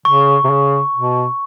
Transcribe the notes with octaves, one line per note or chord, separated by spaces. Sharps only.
C#3 C#6
C3
C#3
B2